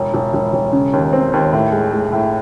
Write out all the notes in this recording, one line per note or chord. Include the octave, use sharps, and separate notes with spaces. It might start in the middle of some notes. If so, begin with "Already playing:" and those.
Already playing: E1
E1
E1
E1
C#3
D#2
C4
D#2
A2
G#3
G#3
A2